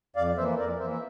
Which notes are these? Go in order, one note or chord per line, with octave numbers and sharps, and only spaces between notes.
F2 D5 F5
E3 A#3 C5 E5
F2 A#4 D5
E3 A#3 C5 E5
E5